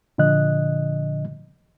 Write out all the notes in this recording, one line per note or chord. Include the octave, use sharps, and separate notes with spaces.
A#2 D3 F3 D#5 F#6